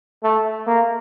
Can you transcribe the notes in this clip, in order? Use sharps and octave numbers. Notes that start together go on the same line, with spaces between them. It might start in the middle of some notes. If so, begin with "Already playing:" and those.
A3
A#3